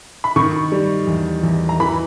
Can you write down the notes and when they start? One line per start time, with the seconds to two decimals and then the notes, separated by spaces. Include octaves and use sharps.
0.24 B5
0.36 D#3 C#6
0.72 G3
1.07 E2
1.43 E2
1.69 A#5
1.80 E3 B5